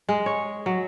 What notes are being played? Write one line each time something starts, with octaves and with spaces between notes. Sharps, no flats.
G#3
C#5
F#3